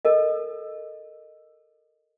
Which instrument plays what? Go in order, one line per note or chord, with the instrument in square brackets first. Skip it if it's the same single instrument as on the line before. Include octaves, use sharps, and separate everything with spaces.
[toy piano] A4 A#4 D#5